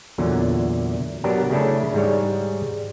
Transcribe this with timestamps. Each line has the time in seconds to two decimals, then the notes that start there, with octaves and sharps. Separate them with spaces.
0.18 E2 A#2 D3 F#3
1.24 F#3 B3 D4 G4 A#4
1.51 C#3 A3 C#4 D4 E4 A4
1.94 G#2 G3 G#3 C#5